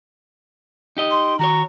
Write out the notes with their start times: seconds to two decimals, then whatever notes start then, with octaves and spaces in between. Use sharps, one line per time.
0.97 D#4 G4 D#5
1.11 C6
1.39 D#3 F#4 C#5 A#5